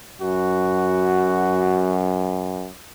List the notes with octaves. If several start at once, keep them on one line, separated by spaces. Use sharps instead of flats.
F#2 F#4